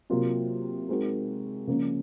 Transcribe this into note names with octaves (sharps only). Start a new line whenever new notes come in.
C3 F#3 A#3 F4 A#4
G#3 C4 D#4 F#4 A#4
C#3 F3 A#3 C#4